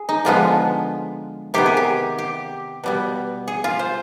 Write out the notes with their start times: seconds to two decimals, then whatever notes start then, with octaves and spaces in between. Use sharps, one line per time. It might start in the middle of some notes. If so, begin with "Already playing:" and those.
Already playing: G#4
0.09 D#4
0.25 D3 F3 G#3 B3 F4
1.54 C3 D#3 B3 G4
1.66 G#4
1.77 G4
2.18 G4
2.84 B2 G3 B3
3.48 G#4
3.64 F4
3.79 C5